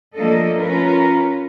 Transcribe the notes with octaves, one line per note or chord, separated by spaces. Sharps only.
F3 A3 A#3 D4 A4 D#5
C#4 F4 A#4 B4